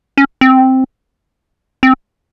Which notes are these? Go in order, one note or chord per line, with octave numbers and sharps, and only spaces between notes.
C#4
C4
C4